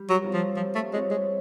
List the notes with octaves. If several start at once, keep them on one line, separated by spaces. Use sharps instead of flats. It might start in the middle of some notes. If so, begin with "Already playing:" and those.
Already playing: G3
F#3
C4 F4 A#4 C#5
F3
F3 G3
A3
G#3 C4 F4 A#4 C#5
G#3